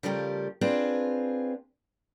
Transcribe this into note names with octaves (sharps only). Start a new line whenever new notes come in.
C#3 F3 G3 A3 G4 A#4
C4 D4 F4 G#4 B4